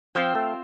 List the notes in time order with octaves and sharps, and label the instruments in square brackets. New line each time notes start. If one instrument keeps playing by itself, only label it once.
[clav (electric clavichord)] F3 [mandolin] C4 F4 C5 G5
[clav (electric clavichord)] A3